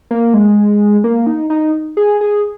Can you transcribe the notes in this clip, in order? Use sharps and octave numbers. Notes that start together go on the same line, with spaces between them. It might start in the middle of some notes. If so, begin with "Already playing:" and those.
A#3
G#3
A#3
D#4
D#4
G#4
G#4